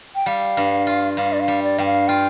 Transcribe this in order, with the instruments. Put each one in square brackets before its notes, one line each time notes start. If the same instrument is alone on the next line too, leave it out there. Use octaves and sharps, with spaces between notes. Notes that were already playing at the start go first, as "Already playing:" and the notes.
[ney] G5
[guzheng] G3 [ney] F5
[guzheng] G2
F4
[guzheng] G2 [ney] F5
[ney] D5
F5
[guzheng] G3
[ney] D5
[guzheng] G2 [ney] G5
[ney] F5
[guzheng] F4 [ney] G5